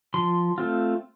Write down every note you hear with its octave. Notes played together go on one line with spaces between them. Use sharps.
F3 C6
A3 C4 F4